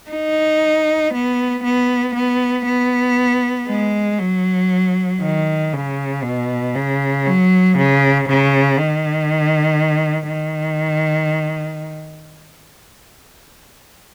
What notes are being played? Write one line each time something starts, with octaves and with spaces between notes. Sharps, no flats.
D#4
B3
B3
B3
B3
G#3
F#3
D#3
C#3
B2
C#3
F#3
C#3
C#3
D#3
D#3